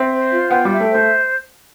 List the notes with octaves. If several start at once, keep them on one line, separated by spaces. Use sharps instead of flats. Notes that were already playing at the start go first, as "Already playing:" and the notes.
Already playing: C4 E5
C5
F4
B3 G5
G3
E5
A3
C5
A3